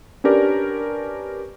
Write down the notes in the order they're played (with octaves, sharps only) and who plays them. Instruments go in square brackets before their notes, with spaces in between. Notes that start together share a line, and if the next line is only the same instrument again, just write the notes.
[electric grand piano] C#4 D4 G4 A#4 B4 D5